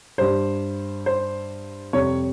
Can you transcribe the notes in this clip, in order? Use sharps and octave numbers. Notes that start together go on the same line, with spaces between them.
G2 G3 C5
C5
F2 C3 G3 C#5